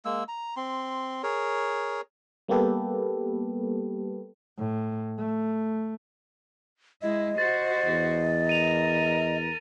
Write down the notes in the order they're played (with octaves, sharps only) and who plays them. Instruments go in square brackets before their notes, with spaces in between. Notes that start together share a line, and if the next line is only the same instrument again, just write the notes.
[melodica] G#3 A#3 E6
A#5
C4 C6
G#4 A#4 C#5
[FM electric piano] G3 A#3 B3 G4 A4 B4
[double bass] A2
A3
[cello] G#3 E4 [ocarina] D#5
[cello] F#4 C5 [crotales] A6
[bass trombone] E2
[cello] A#4 [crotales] D#7 F7